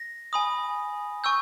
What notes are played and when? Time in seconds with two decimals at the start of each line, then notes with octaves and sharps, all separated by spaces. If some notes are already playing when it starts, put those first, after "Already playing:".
Already playing: A#6
0.33 G#5 B5 D#6
1.24 G#5 C#6 E6 G6